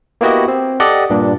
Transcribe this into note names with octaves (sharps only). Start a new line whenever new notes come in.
A#3 B3 E4 F#4 G4 D#5
C4
G4 A4 D5 D#5 F#5
G2 A#2 D4